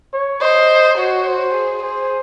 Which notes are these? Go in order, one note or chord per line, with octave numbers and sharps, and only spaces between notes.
C#5
C5 D#5
F#4 C#5
C5
G#4
G#4 C5